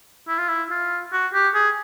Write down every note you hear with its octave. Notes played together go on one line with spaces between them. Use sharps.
E4
F4
E4
F4
F#4
G4
G#4